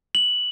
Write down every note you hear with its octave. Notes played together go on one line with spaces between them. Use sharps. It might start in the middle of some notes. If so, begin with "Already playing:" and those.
F#7